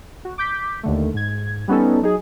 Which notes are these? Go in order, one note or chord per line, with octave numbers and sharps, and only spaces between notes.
F#4
D6 G6 B6
D#2 D3 A3
G#2 G#6
G3 B3 C#4 D#4 A4
F#3 D#4 G#4